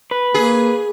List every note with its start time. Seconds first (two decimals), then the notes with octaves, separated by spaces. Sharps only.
0.11 B4
0.34 A#3 G#4